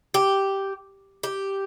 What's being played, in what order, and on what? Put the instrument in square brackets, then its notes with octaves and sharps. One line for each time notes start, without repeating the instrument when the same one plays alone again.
[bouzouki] G4
G4